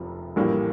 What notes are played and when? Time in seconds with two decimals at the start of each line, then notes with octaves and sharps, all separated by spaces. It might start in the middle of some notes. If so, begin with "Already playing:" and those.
Already playing: F1 F2 C3 F3
0.36 A#1 A2 E3 G3 A#3